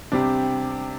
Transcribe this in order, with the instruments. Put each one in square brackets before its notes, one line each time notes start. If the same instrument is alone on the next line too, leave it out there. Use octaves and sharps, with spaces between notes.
[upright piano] C3 G3 D4 [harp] C4